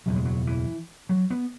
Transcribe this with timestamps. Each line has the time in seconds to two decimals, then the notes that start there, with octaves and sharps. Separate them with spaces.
0.06 F#1 E2 B2 F#3
0.16 G#3
0.25 F#3
0.47 E3
1.09 F#3
1.30 B3